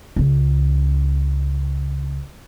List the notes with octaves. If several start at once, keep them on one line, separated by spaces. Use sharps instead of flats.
C#2 C#3